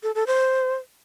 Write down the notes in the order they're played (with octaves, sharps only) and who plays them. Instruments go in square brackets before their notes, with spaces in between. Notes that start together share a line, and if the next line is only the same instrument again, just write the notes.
[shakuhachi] A4
A4
C5